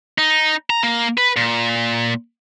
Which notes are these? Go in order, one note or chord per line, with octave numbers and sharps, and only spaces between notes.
D#4
A#5
A#3
B4
A#2